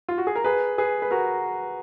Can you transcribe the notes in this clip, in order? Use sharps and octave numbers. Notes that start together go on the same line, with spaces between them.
F4
F#4
G#4
A#4
G#4 B4
G#4 B4
B4
F#4 A#4